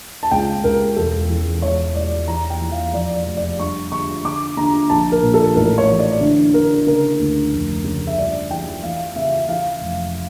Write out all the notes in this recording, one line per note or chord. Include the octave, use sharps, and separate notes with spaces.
A5
C#2 G5
C#2 A#4
E1 A4
E2
E1 C#5
E1 D5
E3 A#5
G5
E3
F5
F2 D5
D5
F1
D5
G2 C#6
D3 C#6
D3 D6
D3 A#5
A#1 A5
A#4
A#2
A4
A1 A#4
C#5
E3
D5
D3
D3 A#4
C#3 A#4
D2
F1
C#3
E5
G2 D5
E3 G5
E3 F5
C#3 E5
E3 F5
F1